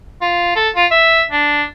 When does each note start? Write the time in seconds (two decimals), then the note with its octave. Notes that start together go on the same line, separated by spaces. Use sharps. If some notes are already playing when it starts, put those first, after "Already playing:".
0.22 F4
0.56 A4
0.76 F4
0.91 E5
1.31 D4